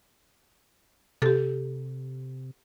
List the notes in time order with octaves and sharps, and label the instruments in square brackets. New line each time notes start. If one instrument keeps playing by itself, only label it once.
[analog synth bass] C3 [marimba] G4 A4